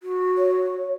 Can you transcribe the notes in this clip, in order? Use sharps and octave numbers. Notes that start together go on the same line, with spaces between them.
F#4
C#5